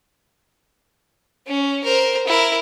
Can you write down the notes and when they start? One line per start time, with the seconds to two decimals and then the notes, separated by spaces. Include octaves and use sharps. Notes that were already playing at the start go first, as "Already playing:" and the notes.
1.47 C#4
1.84 A#4 C5
2.27 E4 A#4